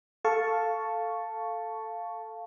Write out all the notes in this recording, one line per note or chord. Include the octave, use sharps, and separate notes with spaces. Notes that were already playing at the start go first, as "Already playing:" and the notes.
A4 F5 A5 C#6